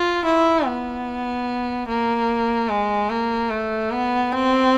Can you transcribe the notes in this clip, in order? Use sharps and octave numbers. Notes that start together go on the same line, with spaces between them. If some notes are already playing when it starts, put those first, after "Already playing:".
Already playing: F4
E4
B3
A#3
G#3
A#3
A3
B3
C4